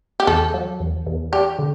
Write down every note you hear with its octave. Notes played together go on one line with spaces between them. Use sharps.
G4
E2 A4
F#3
E2
E2
D4 G4
D3